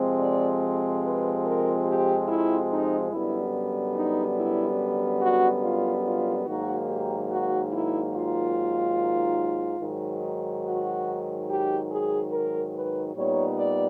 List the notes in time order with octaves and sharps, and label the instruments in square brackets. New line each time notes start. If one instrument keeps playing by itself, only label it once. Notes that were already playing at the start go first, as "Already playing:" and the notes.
Already playing: [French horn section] F2 C3 F3 G#3 C4
D5
B4
A#4
G4
E4
D#4
F#2 D3 G3 B3 E4
D#4
E4
F#4
F4
F4
G#2 D#3 F#3 A#3 F#4
G4
F#4
E4
F4
G#2 D#3 F#3
F#4
G4
G#4
A#4
B4
A#2 G3 B3 D#4 C#5
D5